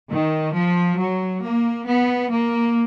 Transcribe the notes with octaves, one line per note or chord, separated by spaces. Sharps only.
D#3
F3
F#3
A#3
B3
A#3